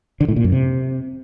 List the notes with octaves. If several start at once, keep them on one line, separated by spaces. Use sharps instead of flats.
D3
A2
A#2
F#2
C3